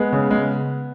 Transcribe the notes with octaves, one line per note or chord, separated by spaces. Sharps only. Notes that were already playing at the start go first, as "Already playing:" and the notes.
Already playing: G#3 B3
C#3
G#3